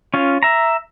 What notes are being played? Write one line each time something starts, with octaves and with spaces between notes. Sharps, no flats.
C#4 F4
E5 A#5